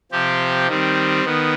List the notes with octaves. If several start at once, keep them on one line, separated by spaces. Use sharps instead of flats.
C3 F3 C4 G4
D#3 G3 C4
D#3 B3